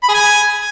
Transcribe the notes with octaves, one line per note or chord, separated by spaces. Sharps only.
B5
G#4
G#5